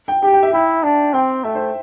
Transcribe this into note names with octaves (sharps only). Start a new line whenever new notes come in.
G5
G4 G5
G5
E5
E4 G5
D4 A5
C4 G5
A3 E5
C5